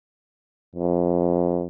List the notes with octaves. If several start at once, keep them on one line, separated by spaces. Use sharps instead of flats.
F2